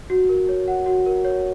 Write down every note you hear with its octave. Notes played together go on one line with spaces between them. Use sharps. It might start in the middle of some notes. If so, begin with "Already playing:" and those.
F#4
A#4
C#5
F#5
F#4
A#4
C#5